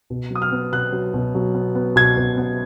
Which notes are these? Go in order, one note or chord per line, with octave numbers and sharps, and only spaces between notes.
B2
F#3 D#6
F6
B3
B2 F#6
F#3
B2
F#3
B3
B3
B2 G#6
B2
B3